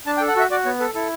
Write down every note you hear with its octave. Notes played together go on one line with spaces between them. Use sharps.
D4 A5
G5
A4
F#5
F#4 E5
F#4 D5
B3 C#5
A4 B4
E4 A4